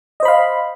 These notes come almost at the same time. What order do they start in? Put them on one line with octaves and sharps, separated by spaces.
D#5 C5 B5 F5